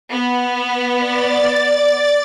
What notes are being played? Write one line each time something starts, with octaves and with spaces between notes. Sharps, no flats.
B3
D5 A6